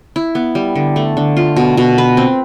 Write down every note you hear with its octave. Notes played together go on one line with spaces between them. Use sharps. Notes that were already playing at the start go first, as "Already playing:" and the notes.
E4
B3
G3
D3
A3
D3
F4
B2
B2
B4
C4